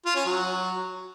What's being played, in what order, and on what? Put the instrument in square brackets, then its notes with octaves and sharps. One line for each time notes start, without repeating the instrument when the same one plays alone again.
[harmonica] F4
C#4
F#3